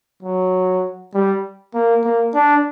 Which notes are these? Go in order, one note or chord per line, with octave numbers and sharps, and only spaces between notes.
F#3
G3
A#3
A#3
D4